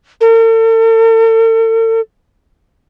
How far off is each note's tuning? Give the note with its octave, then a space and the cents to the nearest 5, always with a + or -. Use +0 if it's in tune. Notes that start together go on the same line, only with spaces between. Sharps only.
A4 +45